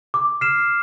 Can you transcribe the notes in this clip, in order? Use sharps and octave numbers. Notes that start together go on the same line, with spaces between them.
D6
F6 C7 E7